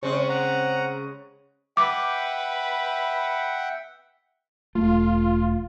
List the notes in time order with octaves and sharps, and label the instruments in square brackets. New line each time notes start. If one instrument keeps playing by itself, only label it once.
[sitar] C#3 G#3 [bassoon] C4 [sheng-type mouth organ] C#6
[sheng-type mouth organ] F#5 A#5
[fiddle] B4 [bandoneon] E5 F#5 G5 [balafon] D6
[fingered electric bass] E1 A3 [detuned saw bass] F4